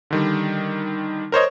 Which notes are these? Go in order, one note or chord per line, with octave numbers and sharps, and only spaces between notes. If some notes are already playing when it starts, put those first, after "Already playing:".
D3 D#3 G3
A#4 C5 C#5 D#5